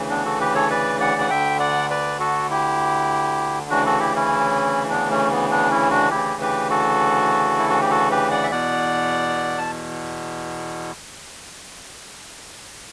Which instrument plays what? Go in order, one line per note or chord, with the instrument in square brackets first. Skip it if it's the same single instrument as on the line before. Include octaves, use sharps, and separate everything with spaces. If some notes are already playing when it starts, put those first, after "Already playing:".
Already playing: [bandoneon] D2 C#3 E3
B3 D4
F#4 A4
G4 B4
A4 C#5
B4 D5
D5 F#5
F#5
D2 D3 E5 G5
D5 F#5
B4 D5
F#4 A4
E4 G4
D2 C#3 E3 D4 F#4
F#4 A4
E4 G4
C#4 E4
B3 D4
A3 C#4
B3
B3 D4
C#4 E4
D4 F#4
D2 C#3 E3 E4 G4
G4 B4
F#4 A4
E4
F#4
G4
F#4 A4
G4 B4
D5 F#5
E5
E2 B2 D5 F#5
A5